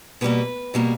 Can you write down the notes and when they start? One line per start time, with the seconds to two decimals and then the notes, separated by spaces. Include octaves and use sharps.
0.21 B2 G3 A#3 B4
0.74 B2 G3 A#3